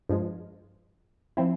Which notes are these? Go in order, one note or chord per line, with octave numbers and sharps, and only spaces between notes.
G2 F3 G#3
F3 C4 E4